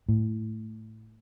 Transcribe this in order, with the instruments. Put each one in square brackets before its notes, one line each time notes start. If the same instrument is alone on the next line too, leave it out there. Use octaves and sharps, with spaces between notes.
[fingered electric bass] A2